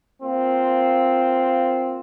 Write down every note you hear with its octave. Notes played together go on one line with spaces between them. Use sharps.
A#3 C4 F4